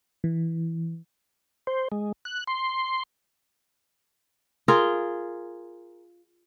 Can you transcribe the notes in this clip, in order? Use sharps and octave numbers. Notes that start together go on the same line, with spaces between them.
E3
C5
G#3
F#6
C6
F4 G#4 A#4